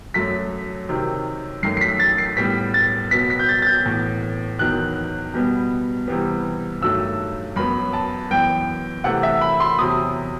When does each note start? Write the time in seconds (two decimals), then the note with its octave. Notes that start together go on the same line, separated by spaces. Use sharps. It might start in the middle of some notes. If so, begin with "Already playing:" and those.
0.14 F#2 F#3 A3 B6
0.89 C3 D#3 F#3
1.63 F#2 D#3 A3 C7
1.77 C7
1.81 B6
1.99 A6
2.18 C7
2.37 A2 G3 B3 B6
2.74 A6
3.11 B2 F#3 B3 B6
3.30 B6
3.39 G6
3.49 A6
3.62 A6
3.67 G6
3.85 A2 E3 B3
4.59 E2 D#3 F#3 B3 F#6
5.34 B2 G3 B3
6.08 C3 E3 G3 B3
6.82 G2 D#3 F#3 A3 E6
7.56 F#2 F#3 B3 B5
7.93 A5
8.30 F#2 E3 B3 G5
9.04 C3 E3 A3 F#5
9.23 E5
9.41 B5
9.60 C6
9.78 E2 C3 F#3 D#6